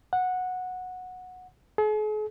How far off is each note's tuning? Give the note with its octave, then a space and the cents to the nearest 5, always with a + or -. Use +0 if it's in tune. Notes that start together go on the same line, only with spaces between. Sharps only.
F#5 -10
G#4 +45